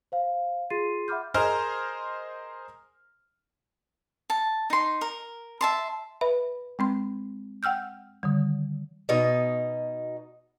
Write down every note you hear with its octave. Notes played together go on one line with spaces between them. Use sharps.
C5 F5
F4 G#4 C6 A6 C7 D#7
E5 F#5 B5 D6 F6 G6
G#4 A#4 C5 D#5 A#5 F6
A5
D#4 C6
A#4
E5 A5 C6
B4 E5 B5
G#3 C4 C6
F#5 G5 E6 F6 G6
D3 D#3 G3
B2 D#4